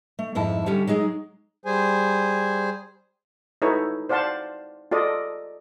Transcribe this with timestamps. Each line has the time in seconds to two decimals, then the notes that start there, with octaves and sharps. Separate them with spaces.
0.19 A3
0.35 F2 G#2 E4 A5
0.66 D3 G3 C#4
0.87 F#3 G#3 D#4 G#4
1.65 G3 G#4 C5 G#5
3.62 D#4 E4 A4 B4 C#5
4.09 C5 D5 F5 F#5 A5 C6
4.91 F4 A4 D5 D#5